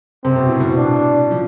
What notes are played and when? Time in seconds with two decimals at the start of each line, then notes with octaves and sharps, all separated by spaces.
0.24 C3 C4
0.36 B2
0.49 A2
0.60 B2
0.77 D4
1.31 F3